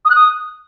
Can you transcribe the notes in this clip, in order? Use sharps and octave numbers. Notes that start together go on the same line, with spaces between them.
D#6
F#6
D#6